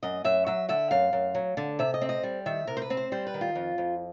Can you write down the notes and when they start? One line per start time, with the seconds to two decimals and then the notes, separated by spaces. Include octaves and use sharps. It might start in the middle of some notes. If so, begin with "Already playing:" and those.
0.03 F#2 D#5
0.24 F#2 E5
0.47 F#3 E5
0.69 D3 E5
0.91 F#2 F5
1.13 F#2
1.35 F#3
1.57 D3
1.79 C3 E5
1.94 D#5
2.01 C4
2.09 D#5
2.23 G3
2.46 D#3 E5
2.67 C3 A#4
2.77 C5
2.82 B4
2.90 C4
2.97 C5
3.12 G3 C5
3.27 B4
3.34 D#3
3.41 F4
3.55 F2
3.78 F2